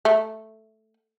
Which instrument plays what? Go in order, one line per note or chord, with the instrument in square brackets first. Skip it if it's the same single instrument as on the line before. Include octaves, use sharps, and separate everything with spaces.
[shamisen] A3